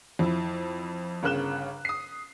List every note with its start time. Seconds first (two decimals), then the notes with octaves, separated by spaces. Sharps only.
0.19 F2 E4
1.23 G1 C#3 A#4 F#6 E7 G7
1.85 D#6 C7